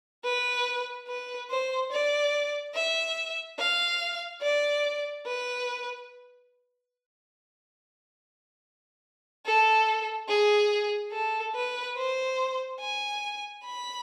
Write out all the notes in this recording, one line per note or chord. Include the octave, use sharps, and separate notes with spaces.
B4
B4
C5
D5
E5
F5
D5
B4
A4
G#4
A4
B4
C5
G#5
B5